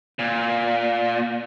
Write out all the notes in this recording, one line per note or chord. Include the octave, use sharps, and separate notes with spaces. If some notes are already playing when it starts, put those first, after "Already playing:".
A#2